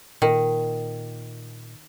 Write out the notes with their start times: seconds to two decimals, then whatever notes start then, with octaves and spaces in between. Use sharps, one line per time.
0.22 A#2 D#3